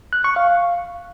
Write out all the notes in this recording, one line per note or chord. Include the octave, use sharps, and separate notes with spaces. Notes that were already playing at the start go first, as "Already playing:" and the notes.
F#6
C#6
F5